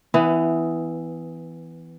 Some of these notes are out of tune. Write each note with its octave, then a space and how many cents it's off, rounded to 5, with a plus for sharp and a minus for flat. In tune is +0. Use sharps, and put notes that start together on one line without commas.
E3 +0 B3 +25